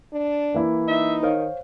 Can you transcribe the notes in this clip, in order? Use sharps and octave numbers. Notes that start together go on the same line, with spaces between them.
D4
E3 A#3 E4
D#4 E5
D#3 C5 C#5 F5